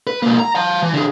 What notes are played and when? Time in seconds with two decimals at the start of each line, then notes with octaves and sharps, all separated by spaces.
0.07 B4
0.22 B2 A#3
0.40 A#5
0.55 F5 A5
0.82 E3
0.94 D3 G#4